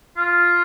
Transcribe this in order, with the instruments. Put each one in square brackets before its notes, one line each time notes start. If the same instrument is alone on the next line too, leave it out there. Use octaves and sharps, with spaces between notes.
[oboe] F4